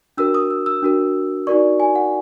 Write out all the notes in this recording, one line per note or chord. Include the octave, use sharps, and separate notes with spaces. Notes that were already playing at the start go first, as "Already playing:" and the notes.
D4 F#4 A#4 E6
D#6
E6
E6
D4 F#4 A#4
D#4 F#4 A#4 D5 C#6
G#5
F#5